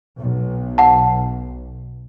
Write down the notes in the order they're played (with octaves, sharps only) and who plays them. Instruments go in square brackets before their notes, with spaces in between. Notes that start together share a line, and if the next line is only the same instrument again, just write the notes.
[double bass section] B1
[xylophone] F#5 A5